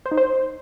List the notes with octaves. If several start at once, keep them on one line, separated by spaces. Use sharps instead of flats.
C5
D#4
C5